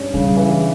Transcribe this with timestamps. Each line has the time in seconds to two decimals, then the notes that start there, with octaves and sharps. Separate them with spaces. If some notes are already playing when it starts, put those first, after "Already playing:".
Already playing: G2 C#4
0.13 C#3 G3
0.37 E3